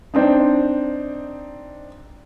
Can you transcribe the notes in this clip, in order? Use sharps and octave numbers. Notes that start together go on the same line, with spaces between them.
C4 D4 D#4